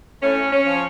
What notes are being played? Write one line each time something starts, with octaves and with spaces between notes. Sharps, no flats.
A2 C#4
C#4
F3